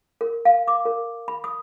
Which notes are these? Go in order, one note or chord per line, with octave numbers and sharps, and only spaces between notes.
A#4
F5
D6
A#4
B5
D#6